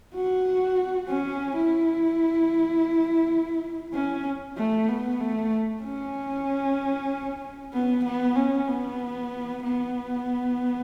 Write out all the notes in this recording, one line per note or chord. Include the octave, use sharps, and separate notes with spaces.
F#4
C#4
E4
C#4
A3
B3
A3
C#4
B3
B3
C#4
B3
B3